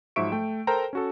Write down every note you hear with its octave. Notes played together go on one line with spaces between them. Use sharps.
G#2 F3 F#3 E5 C#6 D7
A3 G5
A4 A#4 C5 G5 A#5
C#4 F#4 A4